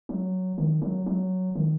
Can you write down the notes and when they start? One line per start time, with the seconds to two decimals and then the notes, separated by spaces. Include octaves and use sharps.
0.09 F#3
0.58 D#3
0.82 F#3
1.06 F#3
1.55 D#3